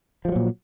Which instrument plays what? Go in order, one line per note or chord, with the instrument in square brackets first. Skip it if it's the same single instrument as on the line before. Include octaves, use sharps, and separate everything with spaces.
[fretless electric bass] F3
G#3
F#3
A#2